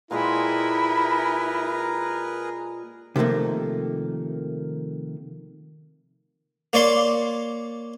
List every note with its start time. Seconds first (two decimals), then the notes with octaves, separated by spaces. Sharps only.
0.11 A#2 G#3 E4 G4 G#4 A#4 B4
3.16 C3 D#3 F3 A3 A#3
6.73 A#3 C#5 D5 C6